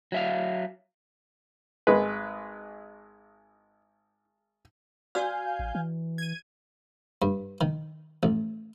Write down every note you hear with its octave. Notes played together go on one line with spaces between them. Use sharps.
F#3 E5 F5
G#1 G#3 B4
F#4 D5 F5 G#5 E6 G6
A1
E3
G#6 D#7
G2
D#3
A1